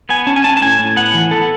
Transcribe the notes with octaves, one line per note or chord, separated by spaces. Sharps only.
B3 G#5
C#4 A5
G#5
C#4 A5
A5
A2 G#5
A2
B3 F#5
E3
B3 A4